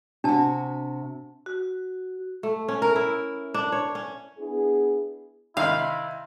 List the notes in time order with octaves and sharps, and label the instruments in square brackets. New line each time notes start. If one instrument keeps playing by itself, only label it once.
[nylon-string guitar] C3 F#4 [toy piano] D4 A5
[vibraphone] F#4
[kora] A3
C#4
A#4
E4
D4
C#5
C#4
[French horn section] B3 D4 E4 G#4
[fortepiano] C3 D#3 [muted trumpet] E4 [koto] F5